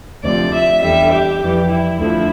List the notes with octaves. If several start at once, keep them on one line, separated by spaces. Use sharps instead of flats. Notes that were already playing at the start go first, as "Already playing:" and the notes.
D2 C3 F3 D5
E5
E2 D3 G3 E5
G4
F2 E3 G3
E4
D2 D3 F3 E4